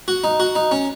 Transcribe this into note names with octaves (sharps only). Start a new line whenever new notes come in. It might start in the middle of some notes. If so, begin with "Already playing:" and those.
F#4
D#4
F#4
D#4
C#4